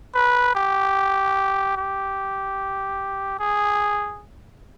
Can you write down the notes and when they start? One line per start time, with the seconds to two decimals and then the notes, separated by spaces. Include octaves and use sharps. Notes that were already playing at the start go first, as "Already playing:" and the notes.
0.15 B4
0.55 G4
1.77 G4
3.39 G#4